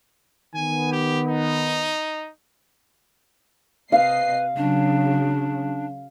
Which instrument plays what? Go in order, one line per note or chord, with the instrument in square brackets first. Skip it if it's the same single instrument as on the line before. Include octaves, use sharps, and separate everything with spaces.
[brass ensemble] D#3 B3 [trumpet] G#5
[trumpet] G4
D#4
[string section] C3 D#5 C7 [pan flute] B4 [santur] F5
[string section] C#3 F#3 [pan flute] D4